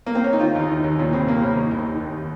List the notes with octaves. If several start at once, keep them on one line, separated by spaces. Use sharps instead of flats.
A#3
C4
C#4
D#4
D#3 F4
D#2 D#4
D#3
D#2
A#2 C#4
C2 C4
A#2 A#3
C2 C#4
D#3 D#4
D#2
D#3
D#2